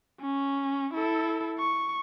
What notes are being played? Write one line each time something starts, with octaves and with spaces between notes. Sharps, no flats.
C#4
E4 A4
C#6